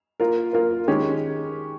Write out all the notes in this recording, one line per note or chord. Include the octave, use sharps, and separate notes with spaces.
A#3 F4 A#4
A#3 F4 A#4
D#3 G#3 C#4 G4